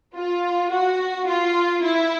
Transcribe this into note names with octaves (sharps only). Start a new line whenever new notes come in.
F4
F#4
F4
E4